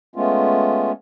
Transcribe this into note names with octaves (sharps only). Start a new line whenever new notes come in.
G#3 A3 B3 C#4 F4